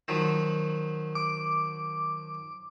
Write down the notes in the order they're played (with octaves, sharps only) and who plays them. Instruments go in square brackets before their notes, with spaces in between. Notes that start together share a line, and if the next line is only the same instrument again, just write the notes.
[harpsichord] D#3 F3 F#3
[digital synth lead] D6